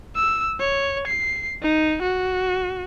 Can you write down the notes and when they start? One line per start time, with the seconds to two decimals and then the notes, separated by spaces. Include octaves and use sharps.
0.15 E6
0.60 C#5
1.07 C7
1.62 D#4
2.02 F#4